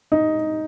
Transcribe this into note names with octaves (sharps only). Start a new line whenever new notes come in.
D#4